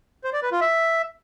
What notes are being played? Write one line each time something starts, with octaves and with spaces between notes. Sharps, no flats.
C5
D5
B4
F4
E5